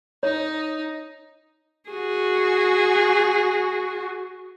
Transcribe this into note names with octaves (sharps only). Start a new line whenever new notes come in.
D#4 C#5
F#4 G#4